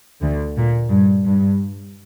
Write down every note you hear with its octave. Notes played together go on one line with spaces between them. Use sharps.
D2 D3
A#2
G2
G2